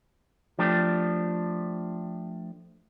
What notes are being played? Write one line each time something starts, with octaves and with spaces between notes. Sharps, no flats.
F3 A3 D4 G4